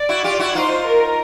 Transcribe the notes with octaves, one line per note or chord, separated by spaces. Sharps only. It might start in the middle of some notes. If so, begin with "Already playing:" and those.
Already playing: D5
E4 F#4
F4 G4
E4 F#4
D#4 F4 C5
A#4